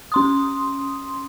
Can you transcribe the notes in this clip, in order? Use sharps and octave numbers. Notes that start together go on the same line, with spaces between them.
C#4 C6 D#6